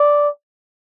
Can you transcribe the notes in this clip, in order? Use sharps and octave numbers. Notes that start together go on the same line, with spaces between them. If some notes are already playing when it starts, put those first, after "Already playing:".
Already playing: D5